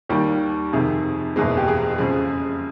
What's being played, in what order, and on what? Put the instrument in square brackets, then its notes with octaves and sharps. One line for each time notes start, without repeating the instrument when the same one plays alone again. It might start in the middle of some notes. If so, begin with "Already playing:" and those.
[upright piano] D#2 D#3 G3 G4
F2 C3 D#3 G#4
F#1 E2 B2 G#3 G#4
G4
G#4
F2 C#3 F3 G#3